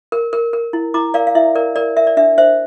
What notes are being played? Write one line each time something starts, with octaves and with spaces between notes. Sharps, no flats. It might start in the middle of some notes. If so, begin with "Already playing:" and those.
A#4
A#4
A#4
E4
E4 A#5 D6
A#4 D5 F5
F5
E4 E5
A#4 D5
A#4 D5
A#4 E5
D5
D4 E5
C5 E5